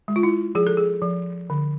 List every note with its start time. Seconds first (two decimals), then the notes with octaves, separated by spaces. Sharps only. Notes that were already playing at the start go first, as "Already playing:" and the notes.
0.08 G#3
0.16 F4
0.23 E4
0.55 F3 G#4
0.67 A4
0.77 G#4
1.02 F3
1.50 D3